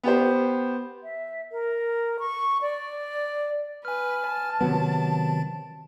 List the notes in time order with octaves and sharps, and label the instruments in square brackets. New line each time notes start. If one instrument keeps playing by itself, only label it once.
[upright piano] B3 G4 C5
[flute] E5
A#4
C#6
D5
[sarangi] B4 [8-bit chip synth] G#5 F6
[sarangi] A5
[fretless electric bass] C3 F#3 B3 [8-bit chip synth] D#3